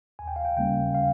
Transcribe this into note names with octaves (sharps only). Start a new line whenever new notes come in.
D#2 G#5
G5
F5
G5
C#3 G3 A#3 C#4 G5
F5